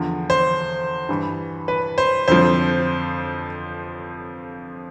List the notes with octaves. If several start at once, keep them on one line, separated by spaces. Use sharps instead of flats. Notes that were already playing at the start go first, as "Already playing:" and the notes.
Already playing: E2 D3 F3
C5
G2 E3
B4
C5
F2 D3 F3 C5